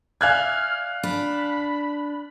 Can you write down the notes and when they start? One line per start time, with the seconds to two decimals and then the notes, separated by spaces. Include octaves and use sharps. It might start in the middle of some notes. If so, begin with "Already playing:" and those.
0.21 D5 E5 F5 G#5 F6 F#6 G#6
1.03 D4 B5